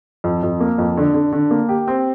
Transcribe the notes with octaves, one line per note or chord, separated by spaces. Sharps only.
F2
F2
A#3
F2
D3
D3
D3
A#3
G4
C4